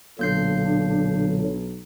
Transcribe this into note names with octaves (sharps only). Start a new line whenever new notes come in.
B1 A#2 D3 F#3 A#3 D4 G6 C7